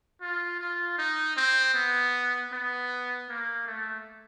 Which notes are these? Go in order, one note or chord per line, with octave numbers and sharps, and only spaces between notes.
F4
F4
D#4
C4
B3
B3
A#3
A3